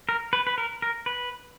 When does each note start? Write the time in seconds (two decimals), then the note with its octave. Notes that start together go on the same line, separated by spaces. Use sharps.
0.09 A#4
0.33 B4
0.47 B4
0.58 A#4
0.82 A#4
1.06 B4